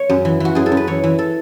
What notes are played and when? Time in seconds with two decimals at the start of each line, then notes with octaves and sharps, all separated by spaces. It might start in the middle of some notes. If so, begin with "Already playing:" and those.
Already playing: C#5
0.10 F#2
0.25 E3
0.40 E3 F#4
0.55 F#2 G#4
0.66 A4
0.72 F#2
0.77 B4
0.87 E3 C#5
1.04 E3
1.18 A4